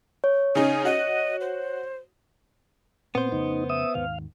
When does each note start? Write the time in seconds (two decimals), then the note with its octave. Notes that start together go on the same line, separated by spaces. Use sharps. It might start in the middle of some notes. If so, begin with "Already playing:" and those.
0.24 C#5
0.55 C#3 D#4 G#5
0.85 F#4 D#5
1.41 C5
3.15 A#2 B3 C4 C5
3.32 F2 C#3 A3 D#4
3.70 E5 D#6
3.95 D#2 G#2 D#3 F5